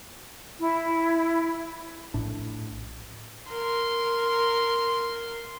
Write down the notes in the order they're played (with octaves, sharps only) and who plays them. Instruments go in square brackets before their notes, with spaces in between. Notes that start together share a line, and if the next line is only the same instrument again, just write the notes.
[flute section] E4
[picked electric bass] A#1 A2 D4
[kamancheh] A#4 C6